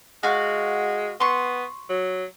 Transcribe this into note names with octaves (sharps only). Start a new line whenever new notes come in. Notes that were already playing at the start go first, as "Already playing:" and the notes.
G#3 F#4 F5
B3 C6 C#6
F#3